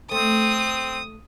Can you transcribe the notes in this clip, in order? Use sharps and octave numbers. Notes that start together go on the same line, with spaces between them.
A3 C4 A4 D#6